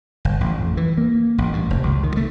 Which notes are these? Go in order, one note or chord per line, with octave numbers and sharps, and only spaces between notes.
G1
A1
F2
E3
A#3
A1
G2
F1
C#2
D#3
A3